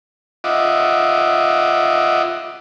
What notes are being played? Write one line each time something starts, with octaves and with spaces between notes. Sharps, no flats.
F4 D#5 E5 F#5 D6